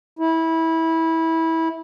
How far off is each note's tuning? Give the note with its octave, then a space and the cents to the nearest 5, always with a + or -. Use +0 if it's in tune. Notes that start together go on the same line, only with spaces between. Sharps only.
E4 -20